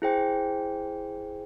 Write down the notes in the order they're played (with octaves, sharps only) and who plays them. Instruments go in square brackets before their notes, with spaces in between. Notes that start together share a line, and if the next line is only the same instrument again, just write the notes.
[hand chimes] E4 G#4 C5 G5